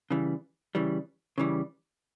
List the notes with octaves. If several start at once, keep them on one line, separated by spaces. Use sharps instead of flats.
C#3 E3 G3
C#3 E3 G3
C#3 E3 G3